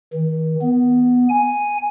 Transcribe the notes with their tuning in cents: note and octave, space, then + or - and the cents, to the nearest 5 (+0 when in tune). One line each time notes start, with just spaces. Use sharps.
D#3 +45
B3 +5
G#5 +0